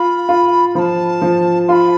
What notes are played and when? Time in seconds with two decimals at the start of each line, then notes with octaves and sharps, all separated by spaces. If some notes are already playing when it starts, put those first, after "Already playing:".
Already playing: F4 B5
0.29 F4
0.75 F3 A5 B5
1.22 F3
1.68 F4 B5 C6